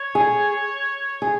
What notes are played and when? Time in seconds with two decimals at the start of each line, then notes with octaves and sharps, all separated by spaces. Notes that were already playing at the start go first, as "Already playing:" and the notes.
Already playing: C#5
0.15 G#4
1.22 G#4